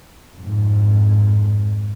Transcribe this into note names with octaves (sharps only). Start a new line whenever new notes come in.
F2 G#2